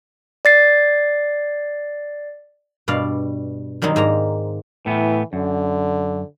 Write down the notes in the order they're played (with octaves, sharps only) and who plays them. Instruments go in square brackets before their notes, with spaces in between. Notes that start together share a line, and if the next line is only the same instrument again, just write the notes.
[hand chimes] D5 A6 C7
[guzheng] G2 B2 D5 F5
D#3 F#3 G3 C4 D#4
G#2 A#3 A#5
[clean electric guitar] A2 B3 [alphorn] E3
[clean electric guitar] F#2 [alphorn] D3